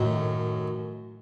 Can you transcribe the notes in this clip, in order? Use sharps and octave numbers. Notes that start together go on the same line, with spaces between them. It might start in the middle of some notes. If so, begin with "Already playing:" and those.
Already playing: F#2 A2 D#3 F#3